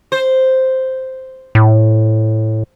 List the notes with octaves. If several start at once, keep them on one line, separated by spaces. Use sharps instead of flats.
C5
A2